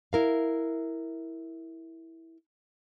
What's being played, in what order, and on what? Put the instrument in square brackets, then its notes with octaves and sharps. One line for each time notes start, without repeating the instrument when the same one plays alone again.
[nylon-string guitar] E4 A#4 F5